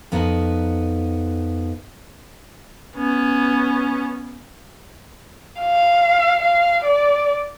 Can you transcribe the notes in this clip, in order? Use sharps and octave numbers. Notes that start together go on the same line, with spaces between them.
F2 B3 D#4 F#4 D#5
B3 C#4
F5
F5
D5